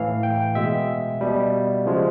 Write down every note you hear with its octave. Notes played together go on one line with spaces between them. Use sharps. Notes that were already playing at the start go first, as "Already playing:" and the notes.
Already playing: A2 E3 A3 F5
G5
B2 G#3 E5
B2 G3
C#3 F3 G#3